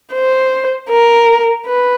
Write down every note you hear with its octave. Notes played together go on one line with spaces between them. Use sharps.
C5
A#4
B4